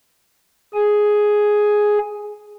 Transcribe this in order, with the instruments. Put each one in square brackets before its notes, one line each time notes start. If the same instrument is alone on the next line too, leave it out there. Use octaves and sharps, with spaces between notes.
[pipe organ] G#4 G#5